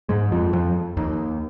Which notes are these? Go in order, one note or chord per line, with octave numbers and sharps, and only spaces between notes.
G#2 G#3
F2 F3
F2 F3
D#2 D#3